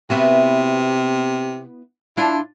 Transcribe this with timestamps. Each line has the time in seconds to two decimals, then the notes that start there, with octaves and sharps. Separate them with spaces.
0.10 C3 B3 E4 F#4
2.17 D4 E4 F4